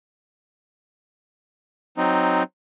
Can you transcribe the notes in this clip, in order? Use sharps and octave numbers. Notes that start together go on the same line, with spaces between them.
F#3 C4 D#4